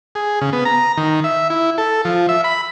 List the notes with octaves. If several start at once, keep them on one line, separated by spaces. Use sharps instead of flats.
G#4
C#3
B3
A#5
D#3
E5
E4
A4
F3
E5
B5